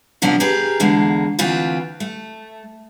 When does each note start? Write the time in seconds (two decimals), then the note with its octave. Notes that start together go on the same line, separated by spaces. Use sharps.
0.22 C3 F3 B3 C#4 D4
0.40 G4 G#4 A#4 B4
0.80 E2 D3 G#3 A#3
1.39 D2 E3 C4 F4 B4
2.00 A3